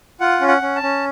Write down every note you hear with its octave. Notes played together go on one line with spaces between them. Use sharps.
F4 F#5
C#4
F#5
C#4
A5
C#4